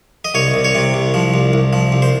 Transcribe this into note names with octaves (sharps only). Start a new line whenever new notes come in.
D#5
C2 C#5
C2
C#5
C3
C2
F3
C2
C2
F3
C2
C5